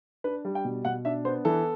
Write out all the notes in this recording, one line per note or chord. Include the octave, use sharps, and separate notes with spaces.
D4 B4
G3
G5
B2
B2 F#5
D4 E5
B3 C5
E3 A4